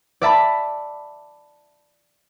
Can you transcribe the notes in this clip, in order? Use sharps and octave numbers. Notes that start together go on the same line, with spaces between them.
D5 E5 A5 B5